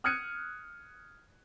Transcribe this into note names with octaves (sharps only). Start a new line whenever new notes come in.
D#6 F6 F#6 G#6 C#7 D#7